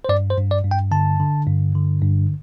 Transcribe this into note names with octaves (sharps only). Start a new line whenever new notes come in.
C5
G2 D5
C5
G2
D5
G2
G5
D3 A5
D3
G2
D3
G2